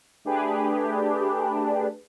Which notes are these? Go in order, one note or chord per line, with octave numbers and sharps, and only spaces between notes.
A3 D4 G4 G#4 B4